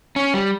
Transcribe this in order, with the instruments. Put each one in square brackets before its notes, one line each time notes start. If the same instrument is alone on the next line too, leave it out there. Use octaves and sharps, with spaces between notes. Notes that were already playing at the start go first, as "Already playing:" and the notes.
[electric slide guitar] C#4
G3